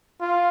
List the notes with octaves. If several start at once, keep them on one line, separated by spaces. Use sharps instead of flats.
F4